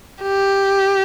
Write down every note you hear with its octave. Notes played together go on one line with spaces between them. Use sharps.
G4